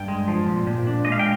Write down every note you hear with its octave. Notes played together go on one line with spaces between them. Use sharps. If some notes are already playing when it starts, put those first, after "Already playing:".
Already playing: G2 G5
G#3
F3
A#2
A#2
D4
G#3 D#5
F5
G5